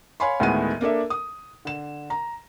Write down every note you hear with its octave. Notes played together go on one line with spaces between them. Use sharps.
C#5 F5 G#5 B5 C6
D2 A2 D#3 G#3 B3 D#7
A#3 D4 A4 E5
D#6
D3 E7
A#5